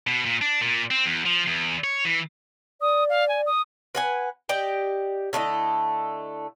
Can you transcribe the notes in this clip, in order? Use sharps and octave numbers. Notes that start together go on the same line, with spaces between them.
B2
A#2
D4
A#2
C4
E2
F3
E2
C#5
E3
D5 D#6
F5
G#5
D#6
B4 F#5 G#5
G4 D5 D#5 G5
D3 A3 E4 D#5